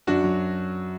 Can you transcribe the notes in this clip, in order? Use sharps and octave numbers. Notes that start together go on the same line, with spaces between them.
F#2 D4 F#4
F#3